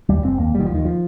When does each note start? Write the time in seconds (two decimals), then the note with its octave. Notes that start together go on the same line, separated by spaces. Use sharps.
0.09 D#2 G3
0.24 F1 C4
0.39 D#2 A#3
0.54 F1 G3
0.60 D#3
0.65 F3
0.70 D#2 D#3
0.85 F3